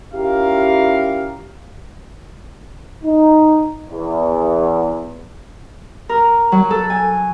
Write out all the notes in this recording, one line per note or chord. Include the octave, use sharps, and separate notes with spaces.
C#4 E4 F4 G4 A#4 F5
D#4
E2
A#4
F#3
A4
G#5